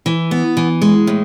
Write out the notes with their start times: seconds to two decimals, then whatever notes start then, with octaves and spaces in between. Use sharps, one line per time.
0.06 E3
0.31 B3
0.57 E3
0.82 G#3
1.07 A2